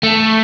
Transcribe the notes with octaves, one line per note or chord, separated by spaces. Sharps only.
A3